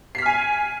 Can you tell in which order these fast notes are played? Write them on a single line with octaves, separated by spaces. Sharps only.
C7 B6 F6 G#5